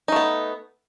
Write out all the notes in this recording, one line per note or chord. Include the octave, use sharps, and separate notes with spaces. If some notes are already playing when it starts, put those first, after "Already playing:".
A3 B3 D#4